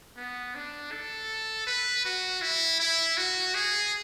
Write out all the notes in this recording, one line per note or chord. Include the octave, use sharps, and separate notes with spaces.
B3
D4
A4
B4
F#4
E4
E4
F#4
G#4